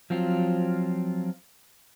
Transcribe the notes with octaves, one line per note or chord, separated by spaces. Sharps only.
F3 F#3 C4 F4